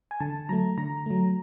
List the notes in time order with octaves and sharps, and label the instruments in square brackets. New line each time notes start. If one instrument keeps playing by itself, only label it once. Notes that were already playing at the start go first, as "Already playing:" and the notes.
[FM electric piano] G#5
D3 A5
F#3 A3 A#5
D3 A#5
F#3 A3